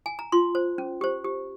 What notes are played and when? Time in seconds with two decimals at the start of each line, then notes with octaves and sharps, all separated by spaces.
0.06 G#5
0.19 A#5
0.32 F4 C6
0.55 C5
0.78 C#4
1.01 G4 C5
1.24 G4